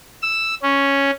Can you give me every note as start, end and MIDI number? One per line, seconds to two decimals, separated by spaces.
0.22 0.55 88
0.63 1.11 61